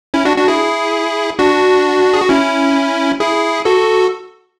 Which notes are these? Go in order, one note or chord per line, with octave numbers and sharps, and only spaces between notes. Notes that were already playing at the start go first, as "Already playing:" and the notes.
C#4 E4
D4 F#4
D4 F#4
E4 G#4
D4 F#4
G#4
F#4
C#4 E4
E4 G#4
F#4 A4